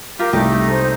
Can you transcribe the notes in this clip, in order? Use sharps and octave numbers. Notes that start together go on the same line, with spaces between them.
F4 G4 A#4
C2 A3 D#4 G4
C5